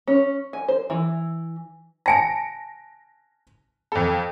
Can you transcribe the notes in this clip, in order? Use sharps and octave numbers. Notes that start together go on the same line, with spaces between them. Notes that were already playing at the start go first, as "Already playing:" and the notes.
C#4
G#5
C5
E3
G#5 A5 A#6 C#7 D7
F2 A4